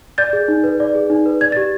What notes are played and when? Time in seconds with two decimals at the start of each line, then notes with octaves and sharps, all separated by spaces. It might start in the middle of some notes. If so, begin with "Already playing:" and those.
0.18 D5 G6 A6
0.33 G#4
0.48 D#4
0.64 B4
0.80 D5
0.95 G#4
1.10 D#4
1.26 B4
1.41 D5 G#6
1.52 G4 A6